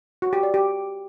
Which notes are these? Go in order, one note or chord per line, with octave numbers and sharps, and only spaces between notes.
F#4
G4
D5
G4